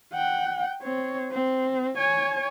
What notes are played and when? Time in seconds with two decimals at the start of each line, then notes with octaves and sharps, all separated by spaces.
0.14 F#5 G5
0.83 C4 C#5
1.32 C4
1.97 C#5 G#5